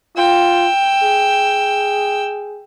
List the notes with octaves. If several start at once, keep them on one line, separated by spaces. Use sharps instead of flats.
F4 G5 E6
G#4